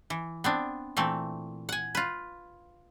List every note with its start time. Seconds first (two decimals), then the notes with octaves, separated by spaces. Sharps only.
0.10 E3
0.44 B3 C4 D4
0.97 A#2 E3 A3 C4
1.69 F#5 G#5
1.95 F4 B4